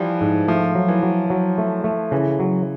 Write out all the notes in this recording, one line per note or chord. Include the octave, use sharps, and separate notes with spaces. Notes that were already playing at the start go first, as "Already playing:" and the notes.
Already playing: E3 F3 G3
G#2
F3 A3
F#3
E3
F#3
F#3
A3
A3
C#3 E3
F#3